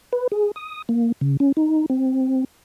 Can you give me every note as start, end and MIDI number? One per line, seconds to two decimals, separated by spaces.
0.13 0.27 71
0.32 0.51 68
0.56 0.82 87
0.89 1.12 58
1.21 1.37 49
1.40 1.52 61
1.57 1.86 63
1.90 2.44 60